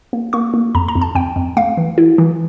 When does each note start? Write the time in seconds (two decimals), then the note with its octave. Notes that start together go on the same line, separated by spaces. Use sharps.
0.13 A#3
0.33 A#3 C#6
0.54 A#3
0.75 F2 A#5
0.88 A#5
0.95 F2
1.01 A5
1.15 F2 G5
1.36 F2
1.57 A3 F5
1.77 E3
1.98 E4
2.18 E3